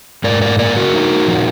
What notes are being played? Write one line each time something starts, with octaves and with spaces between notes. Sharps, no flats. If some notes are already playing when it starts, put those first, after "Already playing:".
G#2 A#4 D5
A#4 D5
A#3 A#4 D5
F#4 A#4
D#4
F3